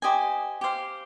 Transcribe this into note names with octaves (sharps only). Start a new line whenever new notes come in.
G4 C5 D#5 G#5
G4 C5 F5